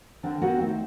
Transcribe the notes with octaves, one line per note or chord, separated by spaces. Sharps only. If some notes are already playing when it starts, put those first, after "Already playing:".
D3 C4 D4 A#4
B3 C4 F#4 A#4 C#5 F#5
D#3 A3 C4 D#4